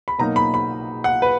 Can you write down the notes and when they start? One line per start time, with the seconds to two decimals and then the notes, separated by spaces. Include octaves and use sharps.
0.08 B5
0.19 B2 F#3 A#3 D#4 A#5
0.36 B5
0.54 B5
1.04 F#5
1.22 B4